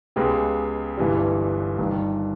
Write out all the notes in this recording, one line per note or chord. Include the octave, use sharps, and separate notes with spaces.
C#2 C#3 G#3 B3 G4
G1 G2 E3 G3
G1 G2 D#3